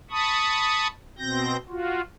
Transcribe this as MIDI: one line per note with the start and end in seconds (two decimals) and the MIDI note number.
0.10 0.87 81
0.10 0.87 83
0.10 0.87 85
0.10 0.87 87
1.18 1.56 47
1.18 1.56 60
1.18 1.56 91
1.18 1.56 94
1.69 2.01 65
1.69 2.01 66